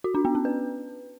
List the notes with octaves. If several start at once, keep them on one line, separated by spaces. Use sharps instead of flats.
F#4
D4
B3
C#4
B4